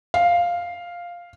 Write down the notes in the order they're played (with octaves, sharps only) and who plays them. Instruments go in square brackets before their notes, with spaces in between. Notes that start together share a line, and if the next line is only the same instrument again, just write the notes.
[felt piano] F5